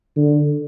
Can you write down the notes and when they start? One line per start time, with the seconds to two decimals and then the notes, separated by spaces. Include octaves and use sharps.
0.16 D3